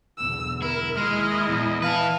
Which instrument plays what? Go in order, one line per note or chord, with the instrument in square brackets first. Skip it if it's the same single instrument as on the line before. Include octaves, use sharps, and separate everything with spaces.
[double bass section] B1 E2 D3 [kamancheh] E6
[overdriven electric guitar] E4 [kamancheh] A#4
[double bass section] D#2 [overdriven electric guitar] G#3 [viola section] E4 D#5 [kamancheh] F6
[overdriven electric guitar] E2 [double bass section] A#2
[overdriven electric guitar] E4 B4 [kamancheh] F5 A5